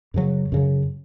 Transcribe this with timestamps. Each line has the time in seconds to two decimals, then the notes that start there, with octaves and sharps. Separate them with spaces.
0.14 F#2 C#3 F#3
0.52 F#2 C#3 F#3